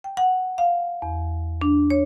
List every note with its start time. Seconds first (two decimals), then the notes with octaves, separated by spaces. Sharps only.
0.04 G5
0.17 F#5
0.58 F5
1.02 E2
1.61 D4
1.90 C#5